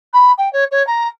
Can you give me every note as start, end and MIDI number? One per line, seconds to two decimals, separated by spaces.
0.13 0.32 83
0.38 0.51 79
0.53 0.65 73
0.72 0.85 73
0.87 1.08 82